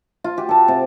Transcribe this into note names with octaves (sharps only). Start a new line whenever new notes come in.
F4
F#4 G4
A4 A5
C3